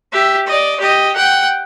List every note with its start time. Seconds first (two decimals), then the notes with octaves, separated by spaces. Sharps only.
0.13 G4 E5
0.47 D5 D#5
0.80 G4 D#5
1.16 F#5 G5